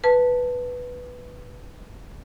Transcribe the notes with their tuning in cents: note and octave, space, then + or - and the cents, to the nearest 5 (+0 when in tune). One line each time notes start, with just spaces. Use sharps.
B4 +0 A5 +5